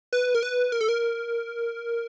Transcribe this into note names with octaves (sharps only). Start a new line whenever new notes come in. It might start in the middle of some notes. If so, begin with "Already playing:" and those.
B4
A#4
B4
A#4
A4
A#4